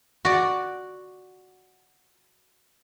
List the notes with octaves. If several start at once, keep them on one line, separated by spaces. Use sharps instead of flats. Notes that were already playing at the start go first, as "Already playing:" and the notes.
F#4 D5